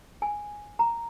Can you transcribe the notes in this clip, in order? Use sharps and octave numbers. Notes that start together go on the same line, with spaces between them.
G#5
A#5